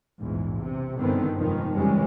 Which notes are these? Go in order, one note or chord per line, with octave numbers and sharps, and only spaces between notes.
A#1 E2 G#2
C3
G1 D3 D#3 B3 C4
F1 G#2 D#3 F3
F2 C#3 E3 G3 G#3 C#4